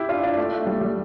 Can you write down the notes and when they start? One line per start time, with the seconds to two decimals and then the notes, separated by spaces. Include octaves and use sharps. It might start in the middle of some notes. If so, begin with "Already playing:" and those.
Already playing: E4 G4
0.09 D4 F4
0.23 D4 F4
0.37 A3
0.52 A3
0.67 G3
0.81 G3